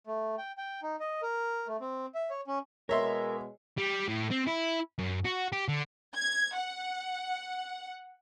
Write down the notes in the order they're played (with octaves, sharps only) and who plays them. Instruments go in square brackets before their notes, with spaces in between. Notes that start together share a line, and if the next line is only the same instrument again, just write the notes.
[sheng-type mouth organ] A3
G5
G5
D#4
D#5
A#4
A3
C4
E5
C#5
C#4
[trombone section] B2 G#3 [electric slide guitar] A#4 [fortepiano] C#5 E5 C6
[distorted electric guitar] G3
A2
C4
E4
F#2
F#4
G4
D3
[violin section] G#6
F#5